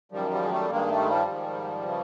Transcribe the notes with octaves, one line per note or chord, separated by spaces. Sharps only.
F#2 D#3 F3 G3
F3 G3
G#3
G3 A3
G2 D#3 G#3 A#3
G3 A3
G#3
F3 G3
G#2 D#3
C#3 E3